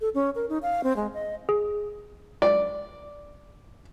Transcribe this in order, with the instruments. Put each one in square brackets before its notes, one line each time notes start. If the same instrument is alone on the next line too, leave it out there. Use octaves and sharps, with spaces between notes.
[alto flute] A4
C#4
A#4
D#4
F5
C4
G#3
D#5
[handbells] G#4
[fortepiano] D5